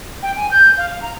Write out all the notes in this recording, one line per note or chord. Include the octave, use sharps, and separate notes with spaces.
G5
G#5
G6
F5
F5
A#5